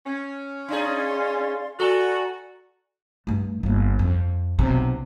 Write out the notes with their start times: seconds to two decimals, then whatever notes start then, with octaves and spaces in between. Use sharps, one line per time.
0.06 C#4
0.68 D4 D#4 G#4 D5 F5 C6
1.80 F#4 A4 D5 G#5 A#5
3.27 G2 A3
3.63 G1 A#3
3.99 F2
4.59 B1 C3